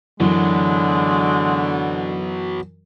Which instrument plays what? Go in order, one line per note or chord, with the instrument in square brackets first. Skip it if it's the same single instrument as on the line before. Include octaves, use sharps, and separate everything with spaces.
[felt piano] F#2 E3 [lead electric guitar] B2 F#3 [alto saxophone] D3 [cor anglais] G#3